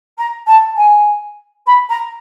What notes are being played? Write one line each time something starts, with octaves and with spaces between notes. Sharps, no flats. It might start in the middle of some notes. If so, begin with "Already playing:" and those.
A#5
A5
G#5
B5
A#5